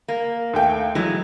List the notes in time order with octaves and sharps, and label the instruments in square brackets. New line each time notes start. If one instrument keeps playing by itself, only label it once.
[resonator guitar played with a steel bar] A#3
[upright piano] D#2 A3 G5
[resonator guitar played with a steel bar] E3 G#3 [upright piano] F#3